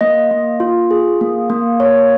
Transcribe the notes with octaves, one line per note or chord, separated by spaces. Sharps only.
A#3 D#5
A#3
F4
G#4
A#3
A#3
A#3 C#5